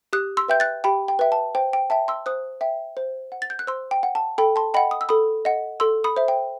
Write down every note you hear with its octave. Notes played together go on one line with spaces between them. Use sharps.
G4 D#6 F#6
C6 E6
B4 E5 G5 G6
F#6 A6
G4 G5 B5
G5
B4 E5 G5
A5
C5 G5
G5
E5 G5 A5
C6 E6
C5 D#6 F#6
E5 G5
C5
F#5
A6
G6
F#6
C5 C6 E6
G5
F#5
A5
A4 G5 B5
A5 C6
D#5 F#5 G5 B5
D#6
E6
A4 B5 D#6
D#5 F#5
A4 C6 E6
B5 D#6
C5 E5
G5